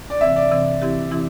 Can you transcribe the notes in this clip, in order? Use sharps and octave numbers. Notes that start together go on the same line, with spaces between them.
D5
C3 E3 C4 E5
D5
C3 E3 C4
E3 C4 E4 G4
E3 C4 E4 G4